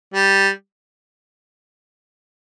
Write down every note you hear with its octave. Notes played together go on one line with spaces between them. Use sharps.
G3